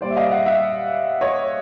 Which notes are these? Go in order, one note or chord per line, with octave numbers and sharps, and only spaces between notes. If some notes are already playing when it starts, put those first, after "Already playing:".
A#2 G3 C5 D5
E5
D#5 F5
E5 F#5
E5 F#5
C#5 D#5